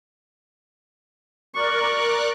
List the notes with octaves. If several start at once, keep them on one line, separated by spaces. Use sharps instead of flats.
A#4 D5 C#6 F#6